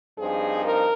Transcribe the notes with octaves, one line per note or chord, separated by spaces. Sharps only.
G2 F3 C4 D#4 G#4
A#4